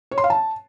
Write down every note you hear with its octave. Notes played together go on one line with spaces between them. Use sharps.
C#5
C6
F5
A5